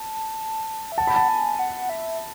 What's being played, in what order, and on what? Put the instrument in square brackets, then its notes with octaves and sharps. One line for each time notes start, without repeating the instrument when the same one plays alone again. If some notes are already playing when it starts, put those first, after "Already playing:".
Already playing: [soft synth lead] A5
E5
[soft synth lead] F#5 [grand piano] A5
[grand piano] B5
A5
[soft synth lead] G#5
F#5
E5